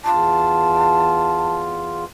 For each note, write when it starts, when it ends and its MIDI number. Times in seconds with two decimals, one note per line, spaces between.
0.04 2.04 40
0.04 2.04 65
0.04 1.54 81